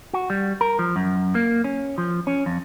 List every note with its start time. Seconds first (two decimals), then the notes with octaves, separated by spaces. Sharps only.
0.13 F#4
0.30 G3
0.61 A#4
0.79 F3
0.96 F#2
1.35 A#3
1.64 C#4
1.98 F3
2.27 C#4
2.46 F2